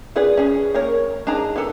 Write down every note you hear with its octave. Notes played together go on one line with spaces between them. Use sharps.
B3 F4 G#4 B4 D5
C#4 G#4
A#3 A#4 C#5
D4 D#4 G#4 A#5
B3 A4